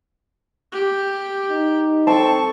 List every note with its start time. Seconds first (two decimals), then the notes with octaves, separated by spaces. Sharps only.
0.72 G4
1.49 D#4
2.07 C4 A4 A5 C#6